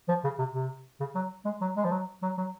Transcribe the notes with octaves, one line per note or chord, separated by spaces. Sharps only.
F3
C#3
C3
C3
C#3
F#3
G#3
F#3
G#3
F3
F#3
F#3
F#3